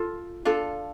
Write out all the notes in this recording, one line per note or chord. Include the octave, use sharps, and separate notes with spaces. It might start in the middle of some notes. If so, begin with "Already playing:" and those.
Already playing: F4 A4
D4 F4 A4